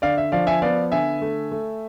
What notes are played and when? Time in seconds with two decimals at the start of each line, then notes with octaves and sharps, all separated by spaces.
0.02 D3 D5 F5
0.18 E5
0.32 F3 D5 F5
0.47 E5 G#5
0.62 B3 D5 F5
0.92 D3 E5 G#5
1.22 A3
1.51 A3